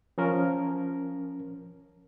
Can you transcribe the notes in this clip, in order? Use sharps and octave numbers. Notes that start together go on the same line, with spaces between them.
F3 C#4 A#4